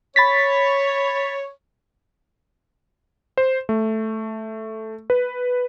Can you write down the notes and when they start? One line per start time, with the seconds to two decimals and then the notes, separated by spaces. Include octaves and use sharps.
0.16 C#5 B5 A6 B6
3.38 C5
3.69 A3
5.10 B4